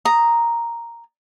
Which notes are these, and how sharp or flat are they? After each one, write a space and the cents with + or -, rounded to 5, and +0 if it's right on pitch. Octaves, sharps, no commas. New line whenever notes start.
A#5 +0 D#6 +0